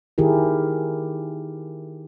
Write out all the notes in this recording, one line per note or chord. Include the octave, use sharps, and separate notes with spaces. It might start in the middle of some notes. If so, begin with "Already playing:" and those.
D#3 E4 G4 G#4 A#4